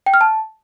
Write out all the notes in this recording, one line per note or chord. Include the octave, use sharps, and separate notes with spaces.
G5
F6
A5